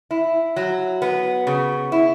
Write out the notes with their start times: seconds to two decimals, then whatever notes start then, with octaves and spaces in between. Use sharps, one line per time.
0.11 E4
0.56 F#3
1.02 B3
1.47 C#3
1.92 E4